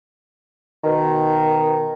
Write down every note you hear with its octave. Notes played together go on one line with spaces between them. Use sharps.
B2 D#3